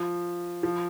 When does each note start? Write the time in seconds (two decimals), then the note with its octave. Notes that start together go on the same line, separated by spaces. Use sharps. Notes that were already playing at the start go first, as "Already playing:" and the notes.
Already playing: F3
0.63 F3